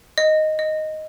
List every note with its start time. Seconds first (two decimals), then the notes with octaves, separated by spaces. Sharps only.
0.18 D#5
0.59 D#5